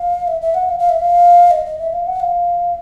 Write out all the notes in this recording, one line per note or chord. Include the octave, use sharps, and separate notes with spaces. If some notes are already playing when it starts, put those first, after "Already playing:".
Already playing: F5
E5
E5
F#5
F5
F5
E5
F5
D#5
D#5
E5
F5
F#5
F5